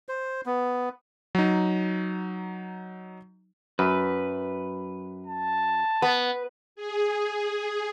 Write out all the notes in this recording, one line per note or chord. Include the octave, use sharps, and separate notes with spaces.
C5
B3
F#3 D#4
F#2 B4
A5
B3 B4
G#4